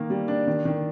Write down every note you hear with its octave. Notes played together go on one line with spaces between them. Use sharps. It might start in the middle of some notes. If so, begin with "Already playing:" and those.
Already playing: D#3 A#3
G3
D4
D#3
D#3